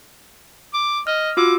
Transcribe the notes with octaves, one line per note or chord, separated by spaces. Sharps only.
D6
D#5 F6
F4 F#4 D6 E6